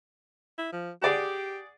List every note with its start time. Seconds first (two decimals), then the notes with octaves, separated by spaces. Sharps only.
0.58 E4
0.73 F3
1.02 G4 G#4 D5 F#5